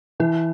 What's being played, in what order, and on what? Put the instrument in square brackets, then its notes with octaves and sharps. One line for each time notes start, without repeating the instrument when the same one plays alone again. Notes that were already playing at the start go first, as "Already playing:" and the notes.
[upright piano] E3 [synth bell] E4